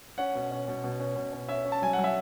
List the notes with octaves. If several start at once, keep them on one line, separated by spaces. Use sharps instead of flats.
C#4 F#5
B2
C#4
B2
B2
C#4
B2
C#4
C#4 E5
C#4
A5
F#3 G#5
F#5
F#3
E5